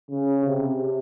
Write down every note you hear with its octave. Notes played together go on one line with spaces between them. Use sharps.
C#3
C3